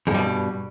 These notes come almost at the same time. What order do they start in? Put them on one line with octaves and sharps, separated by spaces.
E2 G2 G3 B2